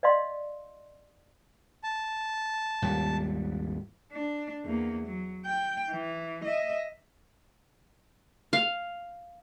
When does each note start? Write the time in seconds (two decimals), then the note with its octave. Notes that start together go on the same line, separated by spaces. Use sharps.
0.03 D5 D#5 F5 C6
1.83 A5
2.82 G#1 D#2 G3
4.12 D4
4.65 E2 A#3
5.06 F#3
5.45 G5
5.91 E3
6.44 D#5 E5
8.53 F5